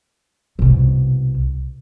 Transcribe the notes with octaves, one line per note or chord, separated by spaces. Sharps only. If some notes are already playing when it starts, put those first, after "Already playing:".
C2 B2